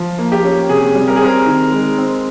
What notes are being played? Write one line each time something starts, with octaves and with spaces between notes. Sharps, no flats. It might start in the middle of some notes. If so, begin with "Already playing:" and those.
Already playing: F3
A#3
G4
C#4
C3 G#4
G3
A#4
G#4
C4 A#4
D#3
G#3
C4